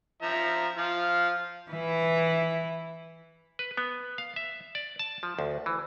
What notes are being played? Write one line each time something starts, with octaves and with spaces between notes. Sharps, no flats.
F3 E5 A#5
F3 F5
E3 E4
B4
B3
F5
E5
D5
A5
F3
D2
E3